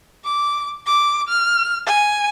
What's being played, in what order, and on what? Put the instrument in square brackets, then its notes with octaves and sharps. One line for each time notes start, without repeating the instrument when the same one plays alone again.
[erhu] D6
D6
F6
G#5